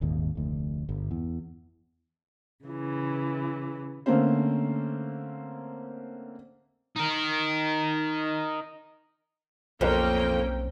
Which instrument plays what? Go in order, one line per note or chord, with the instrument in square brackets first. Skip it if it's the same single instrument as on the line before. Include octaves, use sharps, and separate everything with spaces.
[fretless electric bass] D#1 G#1 D#2
F1 D2
G1
E2
[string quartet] C#3 E3
[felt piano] D3 A3 A#3 C4 C#4 C5
[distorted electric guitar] D#4 A#4
[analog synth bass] B1 [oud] F2 [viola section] A#3 C#4 G5 [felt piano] A#4 C5 C#5